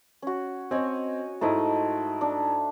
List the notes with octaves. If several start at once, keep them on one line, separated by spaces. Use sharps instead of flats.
C#4 F#4
C4 C#5 D#5 G#5
G#2 A3 E4 C5 D#5
D4